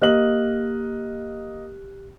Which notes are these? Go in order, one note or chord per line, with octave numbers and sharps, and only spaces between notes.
A#3 G4 D#5 F6 F#6 F#7